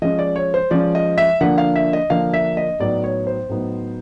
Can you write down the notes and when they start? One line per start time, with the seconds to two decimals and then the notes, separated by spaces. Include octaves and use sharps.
0.02 F3 G#3 C#4 D#5
0.19 D5
0.36 C#5
0.54 C5
0.71 F3 G#3 C#4 D5
0.95 D#5
1.18 E5
1.41 D3 F3 A#3 D4 F#5
1.58 F5
1.76 E5
1.93 D#5
2.10 D3 F3 A#3 D4 F5
2.34 E5
2.57 D#5
2.79 A2 F#3 B3 D#4 D5
3.04 C#5
3.27 C5
3.49 A2 F#3 B3 D#4